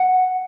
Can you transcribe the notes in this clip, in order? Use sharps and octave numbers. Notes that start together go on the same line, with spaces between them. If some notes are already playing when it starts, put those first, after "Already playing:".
Already playing: F#5